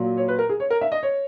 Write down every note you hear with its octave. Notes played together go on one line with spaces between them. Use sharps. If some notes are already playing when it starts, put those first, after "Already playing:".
Already playing: A#2 F#3
C#5
B4
A#4
G#4
C#5
A#4
E5
D#5
C#5